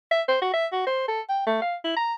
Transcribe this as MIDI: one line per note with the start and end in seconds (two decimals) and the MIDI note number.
0.11 0.22 76
0.28 0.37 72
0.42 0.49 66
0.54 0.67 76
0.73 0.82 66
0.87 1.06 72
1.08 1.21 69
1.29 1.45 79
1.47 1.57 57
1.62 1.76 77
1.84 1.96 64
1.97 2.14 82